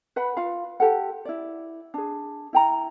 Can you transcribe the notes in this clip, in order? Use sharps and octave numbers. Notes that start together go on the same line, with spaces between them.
B4 F#5 B5
F4 F5
G4 A4 F#5
E4 D5
D4 G#4
E4 G5 A#5